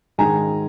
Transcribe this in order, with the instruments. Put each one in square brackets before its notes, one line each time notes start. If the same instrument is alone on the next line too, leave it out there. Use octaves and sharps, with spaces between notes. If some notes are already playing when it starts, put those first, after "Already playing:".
[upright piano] G#2 D#3 G#3 G#5 A#5